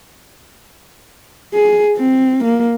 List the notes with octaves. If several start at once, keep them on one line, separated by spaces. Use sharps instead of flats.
G#4
C4
A#3